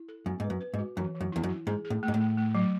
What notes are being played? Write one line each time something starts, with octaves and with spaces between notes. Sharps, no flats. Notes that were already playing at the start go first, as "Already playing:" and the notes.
Already playing: E4
A4
F#2 B3
G#2 B4
F#2
B4
G#2
F#4
F#2 E3
E3
F#2
E2 E4
F#2
E4
G#2 G#4
G#4
A2
A3
G#2
A2
A3
A3
F#3